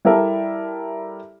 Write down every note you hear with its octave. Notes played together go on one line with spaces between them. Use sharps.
G3 E4 G4 A4 A#4 E5